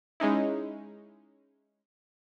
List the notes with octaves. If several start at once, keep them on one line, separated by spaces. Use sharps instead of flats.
G#3 C#4 D#4 E4